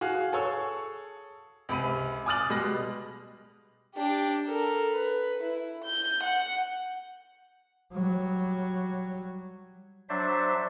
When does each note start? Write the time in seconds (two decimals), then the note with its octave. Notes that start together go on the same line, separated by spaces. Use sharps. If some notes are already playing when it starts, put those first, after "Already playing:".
0.01 F#4 G#4 F5
0.32 G#4 A4 C#5 C#6 E6
1.69 C#2 C3 B5 D#7
2.26 G#5 D6 D#6 F6 A6 F#7
2.49 B2 G3 G#3 B4 A#6
3.95 D4 G4
4.46 A4 A#4
4.92 B4
5.43 E4
5.84 G6
6.23 F#5
7.92 F#3 G3
10.09 F#3 D4 C5 D5 E5